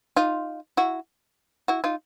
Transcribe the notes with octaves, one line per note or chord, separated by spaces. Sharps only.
D#4 F4
E4 F#4
E4 F#4
D#4 F4